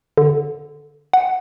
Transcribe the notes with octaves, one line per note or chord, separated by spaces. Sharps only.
D3
F#5